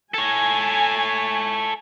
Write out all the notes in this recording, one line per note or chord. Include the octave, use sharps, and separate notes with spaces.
A4 C#5 G#5